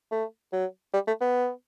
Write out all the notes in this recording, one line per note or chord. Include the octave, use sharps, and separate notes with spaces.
A3
F#3
G3
A3
B3